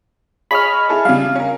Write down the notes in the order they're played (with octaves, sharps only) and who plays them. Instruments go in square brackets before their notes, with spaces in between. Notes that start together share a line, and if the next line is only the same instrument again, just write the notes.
[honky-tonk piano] G#4 C#5 D#5 [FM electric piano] B5 F6
[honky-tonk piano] E4 G#4 A4
[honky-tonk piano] C#3 G3 [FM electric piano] F5
[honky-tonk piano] C#4 A#4